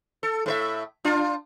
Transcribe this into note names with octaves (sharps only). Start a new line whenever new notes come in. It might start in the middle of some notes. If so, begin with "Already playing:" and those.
A4
A2 B4 E5
D4 F4